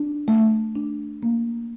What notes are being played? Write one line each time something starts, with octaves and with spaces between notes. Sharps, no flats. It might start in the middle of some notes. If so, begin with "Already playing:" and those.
Already playing: D4
A3
D4
A#3